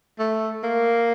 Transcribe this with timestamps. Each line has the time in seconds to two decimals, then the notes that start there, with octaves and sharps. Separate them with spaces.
0.19 A3
0.64 A#3